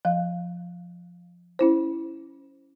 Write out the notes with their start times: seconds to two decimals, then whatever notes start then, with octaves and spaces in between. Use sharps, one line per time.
0.05 F3 F5
1.59 C#4 E4 C5